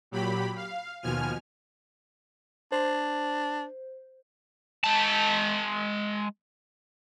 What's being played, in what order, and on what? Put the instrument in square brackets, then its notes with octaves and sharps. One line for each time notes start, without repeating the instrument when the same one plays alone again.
[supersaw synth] A#2 F#3 G4 B5
F5
D#2 B2 F3 G#5 F6
[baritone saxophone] D4 [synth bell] C5
[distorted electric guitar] G#3 A5